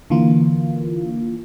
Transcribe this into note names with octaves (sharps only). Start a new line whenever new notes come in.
D3 E3 A#3 F4